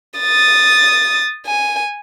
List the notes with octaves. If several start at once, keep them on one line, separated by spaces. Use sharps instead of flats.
D#6 A6
G#5